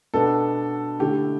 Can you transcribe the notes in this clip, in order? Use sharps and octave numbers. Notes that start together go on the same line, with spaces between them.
B2 B3 D4 A4
D3 A3 E4 G4